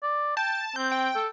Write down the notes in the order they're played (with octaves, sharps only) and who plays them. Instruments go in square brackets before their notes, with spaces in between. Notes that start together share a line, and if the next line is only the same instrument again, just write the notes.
[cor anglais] D5
[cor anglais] G5 [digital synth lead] A5
[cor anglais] C4 [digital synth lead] G6
[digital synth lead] G5
[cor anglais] A4